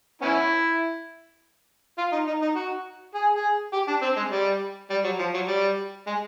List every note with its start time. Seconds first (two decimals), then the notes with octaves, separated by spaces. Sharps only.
0.22 B3 C#4 E4
1.98 F4
2.12 D#4
2.27 D#4
2.42 D#4
2.56 F#4
3.14 G#4
3.36 G#4
3.73 G4
3.88 D4
4.02 C4
4.17 G#3
4.31 G3
4.90 G3
5.04 F#3
5.19 F3
5.34 F#3
5.48 G3
6.07 G#3